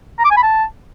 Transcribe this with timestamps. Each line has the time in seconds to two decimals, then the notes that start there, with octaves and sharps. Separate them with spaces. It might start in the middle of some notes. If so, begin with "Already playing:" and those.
0.19 A#5
0.25 D6
0.31 G#5
0.37 B5
0.43 A5